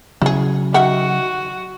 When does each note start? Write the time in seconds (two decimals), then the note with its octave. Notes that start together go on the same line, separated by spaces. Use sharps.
0.22 C#3 F#3 E4 G#4
0.74 D#3 F#4 E5 F#5